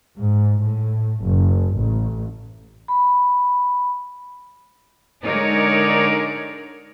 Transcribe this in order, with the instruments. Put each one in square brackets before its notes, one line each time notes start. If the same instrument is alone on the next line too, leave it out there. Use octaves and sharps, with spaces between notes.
[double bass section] G#2
A2
F#1
A1
[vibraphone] B5
[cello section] D3 G#3 D#4 A#4 C#5 D5